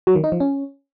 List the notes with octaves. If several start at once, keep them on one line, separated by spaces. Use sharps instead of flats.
F#3
D#3
D#4
F3
C#4